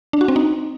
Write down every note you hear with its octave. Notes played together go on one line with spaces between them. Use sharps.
D4
F#4
C4
D#4